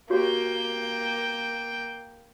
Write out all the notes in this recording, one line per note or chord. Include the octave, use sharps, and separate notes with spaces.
A#3 F#4 G4 C#5 G5